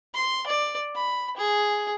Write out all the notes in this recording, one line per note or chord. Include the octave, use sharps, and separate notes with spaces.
C6
D5
B5
G#4